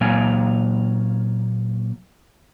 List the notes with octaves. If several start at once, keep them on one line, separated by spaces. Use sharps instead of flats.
A#2 F#3 A#3 F5 G#5